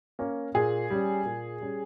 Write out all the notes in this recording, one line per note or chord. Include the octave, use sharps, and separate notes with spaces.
A#3 C#4
A#2 G#4
G3 C#4
A#2
G3 C#4